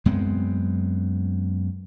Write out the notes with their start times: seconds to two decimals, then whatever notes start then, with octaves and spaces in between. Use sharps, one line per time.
0.05 F#2 G#3 B3 C4